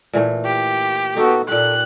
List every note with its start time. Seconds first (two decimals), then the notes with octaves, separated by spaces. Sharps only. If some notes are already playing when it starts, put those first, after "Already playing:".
0.13 A#2 E3 A3
0.45 G4
1.17 B3 D#4 F#4 A4
1.48 A#2 G4 A4 F#6